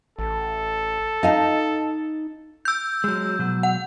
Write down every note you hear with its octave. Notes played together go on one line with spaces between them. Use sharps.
A1 A4
D#4 D#5 F5 A5
E6 G6
F#3 G#3
B2 F#3
F#5